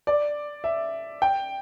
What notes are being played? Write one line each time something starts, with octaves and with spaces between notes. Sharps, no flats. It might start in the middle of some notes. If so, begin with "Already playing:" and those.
D5
E5
G5